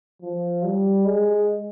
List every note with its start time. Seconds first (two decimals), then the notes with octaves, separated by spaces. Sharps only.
0.22 F3
0.63 G3
1.06 G#3